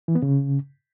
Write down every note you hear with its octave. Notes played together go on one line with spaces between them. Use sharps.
E3
B3
C#3